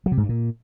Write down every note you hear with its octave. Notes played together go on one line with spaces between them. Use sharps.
F#3
C3
G#2
G2
A#2